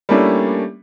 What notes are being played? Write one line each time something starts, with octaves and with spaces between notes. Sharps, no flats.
G3 A3 A#3 C#4 D4 E4